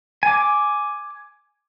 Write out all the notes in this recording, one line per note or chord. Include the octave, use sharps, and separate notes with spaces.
G#5 D6